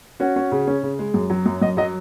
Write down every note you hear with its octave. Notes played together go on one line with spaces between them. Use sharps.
C#4 F#4
C#4
C#3
C#4
C#3
G#3
F#2
F#3
F#2
F#2 D#5
F#3 D#5